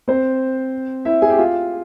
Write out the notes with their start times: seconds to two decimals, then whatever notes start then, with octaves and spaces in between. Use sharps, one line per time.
0.08 C4 C5
1.05 E4 E5
1.22 G#4 G#5
1.30 G4 G5
1.38 F4 F5